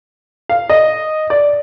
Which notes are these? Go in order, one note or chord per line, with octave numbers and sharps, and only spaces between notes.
F5
D#5
D5